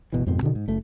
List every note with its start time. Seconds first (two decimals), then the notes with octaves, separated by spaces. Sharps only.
0.12 F#1 B2 E3
0.26 F2 G#2 B2 C4
0.42 B2 D3 D#3
0.55 G#2
0.68 F#1 A3